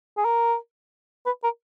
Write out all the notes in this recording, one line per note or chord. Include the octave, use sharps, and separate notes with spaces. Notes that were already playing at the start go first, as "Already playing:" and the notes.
G#4
A#4
B4
A#4